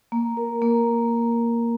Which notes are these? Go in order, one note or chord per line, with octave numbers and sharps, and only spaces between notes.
A#3
A#4
A#3